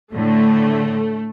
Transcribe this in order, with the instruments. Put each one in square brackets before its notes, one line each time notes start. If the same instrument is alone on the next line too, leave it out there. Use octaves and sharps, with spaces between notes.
[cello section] A2 D3 [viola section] A3